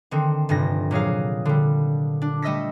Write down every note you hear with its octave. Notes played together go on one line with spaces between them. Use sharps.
D3 D#3 C4
F1 G2 A#6
A#2 F#3 G#4 F5
D3 G3
D4
G3 A3 D#5 E6 A#6 B6